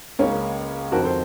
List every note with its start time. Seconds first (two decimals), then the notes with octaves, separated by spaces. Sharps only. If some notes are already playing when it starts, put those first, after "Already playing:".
0.19 C#2 C#3 A#3 C#4
0.92 F2 D#3 F#4 A#4
1.04 A4 C5